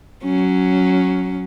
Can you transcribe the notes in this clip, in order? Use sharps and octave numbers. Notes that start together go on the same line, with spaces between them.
F#3 C#4